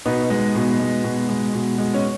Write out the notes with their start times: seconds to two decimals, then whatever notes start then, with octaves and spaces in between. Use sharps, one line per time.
0.05 B2 B3 D#4
0.30 G#3
0.55 B2
0.79 G#3
1.04 B2
1.29 G#3
1.54 B2
1.78 G#3
1.94 C#4